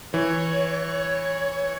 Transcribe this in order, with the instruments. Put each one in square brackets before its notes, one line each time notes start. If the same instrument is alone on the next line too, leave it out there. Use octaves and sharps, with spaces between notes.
[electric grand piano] E3 [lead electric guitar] C#5